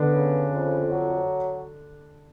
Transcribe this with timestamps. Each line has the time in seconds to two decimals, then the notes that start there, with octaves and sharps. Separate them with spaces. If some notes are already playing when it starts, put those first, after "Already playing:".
Already playing: D3 B3 D4
0.12 C#3
0.51 F2
0.90 F#3